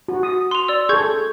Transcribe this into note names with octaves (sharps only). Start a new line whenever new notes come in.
F#4
D#6
C6 F7
D5 E6
G#4 A4 C#6 G6 G#6